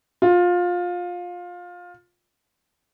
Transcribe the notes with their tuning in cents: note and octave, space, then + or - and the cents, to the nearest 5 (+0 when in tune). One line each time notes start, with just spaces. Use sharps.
F4 +20